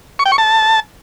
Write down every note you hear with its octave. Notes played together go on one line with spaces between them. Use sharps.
C#6
G5
C#6
A5